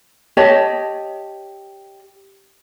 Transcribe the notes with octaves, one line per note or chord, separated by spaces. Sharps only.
G4 C#5 D#5 A5